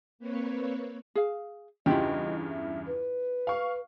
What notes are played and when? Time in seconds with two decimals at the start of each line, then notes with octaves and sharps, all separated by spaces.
0.19 A#3 C4 B4 C#5
1.15 G#4 F5
1.86 E2 G2 C#3 E4 F4 G4 D#5
2.49 E5
2.86 B4
3.47 F5 C#6